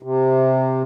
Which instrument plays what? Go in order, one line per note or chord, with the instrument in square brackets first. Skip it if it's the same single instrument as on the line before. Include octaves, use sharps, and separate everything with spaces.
[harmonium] C3